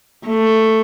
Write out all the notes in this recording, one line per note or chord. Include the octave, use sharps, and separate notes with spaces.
A3